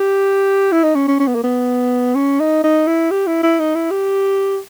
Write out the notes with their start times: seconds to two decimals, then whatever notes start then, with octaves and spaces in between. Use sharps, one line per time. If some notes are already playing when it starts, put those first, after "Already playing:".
Already playing: G4
0.72 E4
0.83 D#4
0.95 C#4
1.08 C#4
1.20 C#4
1.27 B3
1.35 A#3
1.44 B3
2.15 C#4
2.40 D#4
2.64 D#4
2.87 E4
3.11 G4
3.27 E4
3.43 E4
3.60 D#4
3.75 E4
3.91 G4